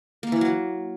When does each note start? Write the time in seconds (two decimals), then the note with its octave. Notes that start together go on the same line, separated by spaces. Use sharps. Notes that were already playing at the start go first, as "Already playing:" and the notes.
0.23 A#3
0.32 E3
0.41 F#3